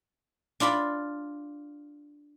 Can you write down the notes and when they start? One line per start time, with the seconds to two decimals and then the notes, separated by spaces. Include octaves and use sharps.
0.60 D4 F4 D5 B5